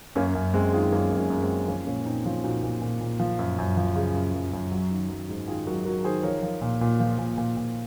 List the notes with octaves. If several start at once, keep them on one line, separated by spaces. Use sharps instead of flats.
F#2 A#3 C#4
F#2
F#2 G#3 C4
D#3 F4 G#4
F#2 A#3 C#4
F#2
A#3 C#4
F#2
G#3 C4
F#3
F3 A#3 C#4
A#2 A#3 C#4
A#2 C4 D#4
F3 C#4 F4
A#2 D#4 F#4
A#2
A#2
A#2
F3
F#2
F#2
F3
C#3
F#2
F#2
F#2
F#3
D#3
F#3
G#2
D#3 F4 G#4
F#3 F#4 A#4
F#3 F#4 A#4
D#3 G#4 C5
F3 A#4 C#5
F3
A#2
A#2
F3
A#2
A#2
A#2